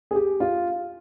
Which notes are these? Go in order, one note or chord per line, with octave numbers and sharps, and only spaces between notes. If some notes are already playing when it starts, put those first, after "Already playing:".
G#4
G4
F4